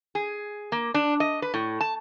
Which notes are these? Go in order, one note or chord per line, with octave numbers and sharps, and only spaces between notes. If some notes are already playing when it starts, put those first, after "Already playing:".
G#4
A#3
D4
D#5
B4
A2
A5